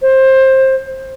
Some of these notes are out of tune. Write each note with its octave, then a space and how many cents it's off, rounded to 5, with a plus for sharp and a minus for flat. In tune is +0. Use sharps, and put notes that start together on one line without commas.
C5 +20